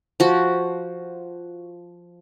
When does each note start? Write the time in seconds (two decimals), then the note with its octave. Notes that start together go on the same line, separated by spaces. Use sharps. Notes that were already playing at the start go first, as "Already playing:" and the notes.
0.20 F3 F#4